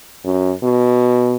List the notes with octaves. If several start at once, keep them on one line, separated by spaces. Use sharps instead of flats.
F#2
B2